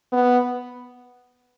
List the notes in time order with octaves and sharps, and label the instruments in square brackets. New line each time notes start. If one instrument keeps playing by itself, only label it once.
[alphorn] B3